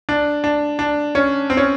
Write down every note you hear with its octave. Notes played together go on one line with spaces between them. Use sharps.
D4
D4
D4
C#4
C4
C#4